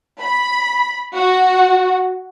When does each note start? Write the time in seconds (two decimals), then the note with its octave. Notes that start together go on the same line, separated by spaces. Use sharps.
0.22 B5
1.14 F#4